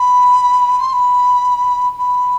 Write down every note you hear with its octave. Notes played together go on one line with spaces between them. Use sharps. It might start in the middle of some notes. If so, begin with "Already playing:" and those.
Already playing: B5
C6
B5
B5